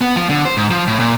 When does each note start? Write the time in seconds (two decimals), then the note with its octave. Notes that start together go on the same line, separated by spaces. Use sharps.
0.01 B3
0.16 F3
0.30 D3
0.45 C5
0.57 G#2
0.71 F3
0.87 A2
1.00 A#2